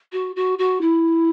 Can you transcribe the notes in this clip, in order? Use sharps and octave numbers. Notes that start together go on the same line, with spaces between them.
F#4
F#4
F#4
E4